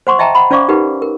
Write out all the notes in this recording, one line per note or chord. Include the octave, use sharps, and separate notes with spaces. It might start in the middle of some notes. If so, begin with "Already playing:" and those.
C5 F#5 C6 C#6
D#5 E5 G5 A5 A#5
F#5 B5
C#4 C5 D5 F5 C#6 D6
D#4 G4 A#4 B4 F#5
A#4